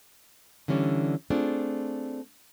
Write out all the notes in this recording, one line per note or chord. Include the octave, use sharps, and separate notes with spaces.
D3 E3 G3 C#4 D4
A3 C4 D4 F4 G#4